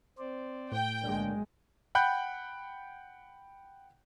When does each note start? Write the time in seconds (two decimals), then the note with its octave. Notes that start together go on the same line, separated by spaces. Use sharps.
0.19 C4 C5 D5
0.72 A2 G5
1.03 B1 D3 G#3 A#3 D4
1.95 F#5 G5 B5 F#6 G6